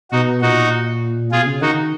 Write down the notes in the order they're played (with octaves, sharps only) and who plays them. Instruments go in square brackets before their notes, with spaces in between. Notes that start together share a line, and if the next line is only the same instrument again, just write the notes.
[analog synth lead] B2 [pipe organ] D#4 F#4
[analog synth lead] A#2 [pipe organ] D#4 F#4
[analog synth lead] B2 [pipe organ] F4 G#4
[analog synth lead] C#3
[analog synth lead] D#3 [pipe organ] D#4 F#4